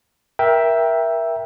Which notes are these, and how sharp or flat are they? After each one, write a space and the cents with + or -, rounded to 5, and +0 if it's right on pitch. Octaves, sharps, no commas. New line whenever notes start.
A#4 +25 E5 +0 G5 +0